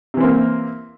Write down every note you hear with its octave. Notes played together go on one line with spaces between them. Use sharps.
C3 E3 A#3 C4